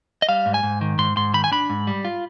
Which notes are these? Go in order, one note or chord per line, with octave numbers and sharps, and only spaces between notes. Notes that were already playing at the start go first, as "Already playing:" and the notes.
D#5
G3 F5
G#2
G#5
G#2
D#3
G#2 C6
G#2 C6
D#3 B5
G#5
D4 B5
G#2
G3
F4